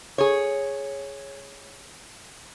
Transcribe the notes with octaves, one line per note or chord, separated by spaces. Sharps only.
G#4 C#5